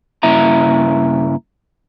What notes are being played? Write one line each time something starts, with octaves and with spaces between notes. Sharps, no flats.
G2 C#3 A#3 E4 E5 A#5